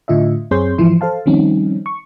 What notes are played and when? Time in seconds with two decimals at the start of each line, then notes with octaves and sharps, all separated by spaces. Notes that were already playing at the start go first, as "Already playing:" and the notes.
0.08 A2 D3 F4 D#5 E5
0.51 F#2 C4 G#4 C#5 C6 G6
0.78 G#2 E3 F3 E4 C6
1.01 A4 C5 F5 A5
1.26 D#3 F3 G3 C4 C#4 D#4
1.86 C#6